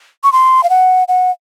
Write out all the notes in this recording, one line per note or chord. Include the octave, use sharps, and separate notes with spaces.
C#6
C6
F5
F#5
F#5